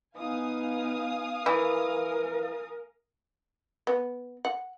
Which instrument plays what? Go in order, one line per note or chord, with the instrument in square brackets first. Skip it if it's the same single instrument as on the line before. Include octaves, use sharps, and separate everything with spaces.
[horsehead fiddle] B3 D#4 [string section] F5 G#5 D#6
[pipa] E3 [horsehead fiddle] A#4
[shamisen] B3
F#5